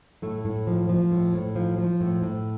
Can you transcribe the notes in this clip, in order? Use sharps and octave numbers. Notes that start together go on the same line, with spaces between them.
A2 A3
A2
F3
F3
A2
A2
F3
F3
A2
A2